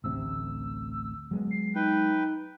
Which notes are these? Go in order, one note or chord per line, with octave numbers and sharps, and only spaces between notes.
A1 D2 C3 E6
F#3 G#3 B3
C7
D#4 B4 G5